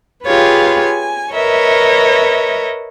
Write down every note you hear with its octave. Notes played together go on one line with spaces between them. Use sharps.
F4 G4 G#4 B4 C#5 F5
G#5
A#4 B4 C#5 D#5 E5